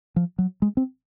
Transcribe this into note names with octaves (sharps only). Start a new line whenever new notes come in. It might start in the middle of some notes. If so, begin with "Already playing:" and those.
F3
F#3
G#3
C4